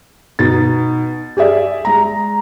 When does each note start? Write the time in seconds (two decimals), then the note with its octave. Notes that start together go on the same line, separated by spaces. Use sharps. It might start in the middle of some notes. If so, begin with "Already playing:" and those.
0.39 B2 D#4 A6
1.37 G4 G#4 D5 E5
1.85 G#3 A#5